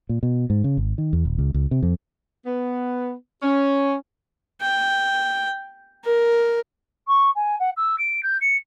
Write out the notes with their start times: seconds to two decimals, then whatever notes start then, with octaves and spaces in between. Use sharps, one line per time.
0.09 A#2
0.23 B2
0.50 G#2
0.64 C#3
0.77 G#1
0.98 D#3
1.13 E2
1.25 D#1
1.38 C#2
1.54 C#2
1.71 C3
1.83 F2
2.45 B3
3.42 C#4
4.61 G5
6.05 A#4
7.07 C#6
7.35 G#5
7.60 F#5
7.76 E6
7.98 D7
8.23 G6
8.41 C#7